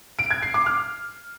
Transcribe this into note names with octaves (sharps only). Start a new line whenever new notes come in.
D7
G#6
C7
D6
F6